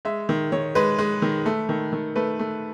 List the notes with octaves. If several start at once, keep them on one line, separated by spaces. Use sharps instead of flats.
G#3 E5
D#3
D#3 C#5
G#3 B4
G#3
D#3
A3
D#3
D#3
A3 B4
A3